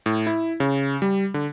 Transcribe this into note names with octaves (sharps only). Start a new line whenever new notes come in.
A2
E4
C#3
G3
D3